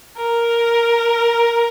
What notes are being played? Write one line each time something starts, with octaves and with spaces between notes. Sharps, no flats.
A#4